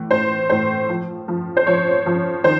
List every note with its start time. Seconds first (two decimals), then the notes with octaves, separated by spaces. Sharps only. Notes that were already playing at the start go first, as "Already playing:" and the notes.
Already playing: A2 E3
0.11 A2 C5
0.50 A2 C5
0.89 F3
1.28 F3
1.57 C5
1.67 F3 C#5
2.06 F3
2.44 D#3 C5